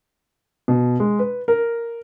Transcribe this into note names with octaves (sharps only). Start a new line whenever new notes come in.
B2
G#3
B4
A#4